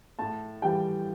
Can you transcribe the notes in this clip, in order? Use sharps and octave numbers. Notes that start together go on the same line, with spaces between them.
A2 A5
E3 G3 G5